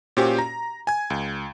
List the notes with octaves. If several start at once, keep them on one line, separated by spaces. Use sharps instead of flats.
A#2 C#4 F#4 G4 C5 G5
A#5
G#5 G#6
C#2